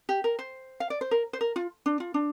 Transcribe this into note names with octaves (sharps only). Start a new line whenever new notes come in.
G4
A#4
C5
F5
D5
C5
A#4
C5
A#4
F4
D4
F4
D4